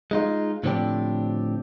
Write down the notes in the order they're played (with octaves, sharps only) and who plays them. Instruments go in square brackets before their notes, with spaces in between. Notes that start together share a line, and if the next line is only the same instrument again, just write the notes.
[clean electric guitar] G#3 D#4 F4
A2 D3 F3 C4 D4 G4